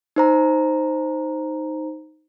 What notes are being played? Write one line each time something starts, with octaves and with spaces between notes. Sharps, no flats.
D#4 C5 A#5